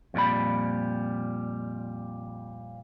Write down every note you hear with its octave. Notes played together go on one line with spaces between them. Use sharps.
F2 A#2 G3 B5